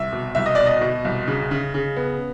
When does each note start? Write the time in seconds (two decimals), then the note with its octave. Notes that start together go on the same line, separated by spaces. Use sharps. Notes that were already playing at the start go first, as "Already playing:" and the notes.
Already playing: C2 E5
0.13 B2
0.35 C2 E5
0.46 D#5
0.55 B2 D5
0.66 D#5
0.81 B2
1.05 C2
1.27 C#3
1.51 C#3
1.74 C#3
1.97 B3